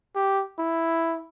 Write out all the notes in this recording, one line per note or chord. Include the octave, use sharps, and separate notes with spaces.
G4
E4